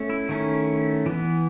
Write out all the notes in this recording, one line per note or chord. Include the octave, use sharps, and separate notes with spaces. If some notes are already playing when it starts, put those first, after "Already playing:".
Already playing: A3 C#4
E4
D#3 A3 C#4
E3 B3